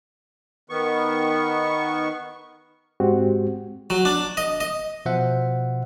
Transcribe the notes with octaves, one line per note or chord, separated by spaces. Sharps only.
D#3 B3 C#6
G#2 G#3 C4 F#4 G4
F#3
D4
D#5
D#5
B2 F3 C5 E5 F#5